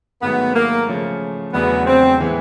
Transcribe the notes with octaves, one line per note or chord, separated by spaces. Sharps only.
G#2 D#3 F#3 A3 B3
A#3
C#3 F3 A3 C#4
E2 C#3 F#3 A3 B3 D4
C4
A2 E3 G#3 B3 E4